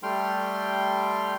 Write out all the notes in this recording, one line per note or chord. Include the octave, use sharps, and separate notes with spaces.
G3 A3 G5 C6 F6